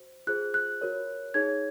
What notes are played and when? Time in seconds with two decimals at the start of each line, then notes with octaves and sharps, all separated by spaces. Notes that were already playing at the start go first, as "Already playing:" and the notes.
Already playing: F#4 C5
0.27 F4 G#4 C5 F#6
0.54 F#6
0.81 F#4 A#4 C#5
1.34 D#4 G#4 C#5 G#6